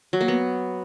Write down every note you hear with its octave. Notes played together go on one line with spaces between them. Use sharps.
F#3
A#3
B3